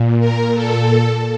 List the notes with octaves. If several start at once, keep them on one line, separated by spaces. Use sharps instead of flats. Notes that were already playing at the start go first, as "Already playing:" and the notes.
Already playing: A#2
A#4
A4